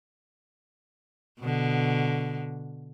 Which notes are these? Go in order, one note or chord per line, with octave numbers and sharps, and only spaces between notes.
B2 D3